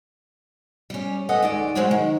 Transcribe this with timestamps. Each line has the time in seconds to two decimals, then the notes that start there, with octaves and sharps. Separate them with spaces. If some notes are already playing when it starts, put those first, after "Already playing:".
0.90 G3 C#4
1.29 A4 B4 D#5 F#5 G#5
1.42 D#2 G#3 D5
1.75 F#3 G#3 C4 C#4 F#4 G4
1.91 D#3